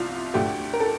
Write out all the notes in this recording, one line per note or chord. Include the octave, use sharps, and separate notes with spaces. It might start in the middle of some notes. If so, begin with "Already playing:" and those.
Already playing: C2 C3 F3 F4
D2 D3 A3 G4
A#4
A4